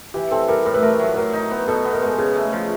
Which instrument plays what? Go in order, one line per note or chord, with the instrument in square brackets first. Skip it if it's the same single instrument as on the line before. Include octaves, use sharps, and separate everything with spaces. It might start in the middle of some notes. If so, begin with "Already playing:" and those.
[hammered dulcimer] E3 [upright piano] G4
[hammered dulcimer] C4 [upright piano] A4
[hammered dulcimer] G3 [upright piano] A#4
[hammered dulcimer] A2 [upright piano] A#4
[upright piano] B4
[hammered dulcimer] A3 [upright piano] A#4
[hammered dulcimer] F#3
[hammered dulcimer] F#3 [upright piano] A#4
[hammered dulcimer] D#4
B3
[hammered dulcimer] B2 [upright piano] A4
[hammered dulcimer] B3
[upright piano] A#4
[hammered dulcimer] G#3 [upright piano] A4
[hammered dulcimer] C#3 [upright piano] G#4
[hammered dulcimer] A3
F3